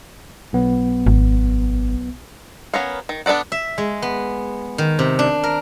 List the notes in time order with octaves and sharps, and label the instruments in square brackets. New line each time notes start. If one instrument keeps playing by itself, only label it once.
[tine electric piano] B1 B3
[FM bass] G#1
[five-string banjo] B3 C#4 A#4 C#5 F5
D#3
B3 D4 A4 D5 F#5
[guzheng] E5
G#3
B3
D#3
C3
D4
A#4